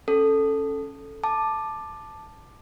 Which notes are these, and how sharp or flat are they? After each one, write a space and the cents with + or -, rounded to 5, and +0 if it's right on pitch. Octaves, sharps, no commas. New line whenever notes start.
C#4 -5 A4 +0
A5 +0 D6 +15